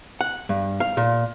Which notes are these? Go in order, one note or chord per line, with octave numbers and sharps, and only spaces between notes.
F#5
G2
F5
A#2